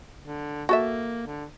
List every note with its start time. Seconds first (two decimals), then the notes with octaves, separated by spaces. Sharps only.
0.24 D3
0.69 A#3 F#4 A4 E5
1.27 D3